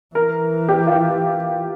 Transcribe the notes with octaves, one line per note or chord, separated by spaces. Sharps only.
E3 A#4
G4
F4